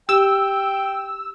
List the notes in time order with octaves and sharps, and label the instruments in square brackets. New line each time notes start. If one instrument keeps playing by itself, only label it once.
[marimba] G4 [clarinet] G5 [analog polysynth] E6